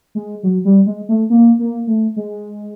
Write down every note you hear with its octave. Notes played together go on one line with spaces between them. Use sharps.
G#3
F#3
G3
G#3
A3
A#3
A#3
A3
G#3